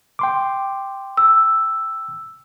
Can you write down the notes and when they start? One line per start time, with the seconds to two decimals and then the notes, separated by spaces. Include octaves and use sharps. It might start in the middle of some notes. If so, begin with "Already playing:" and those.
0.19 G5 C6 D6
1.17 E6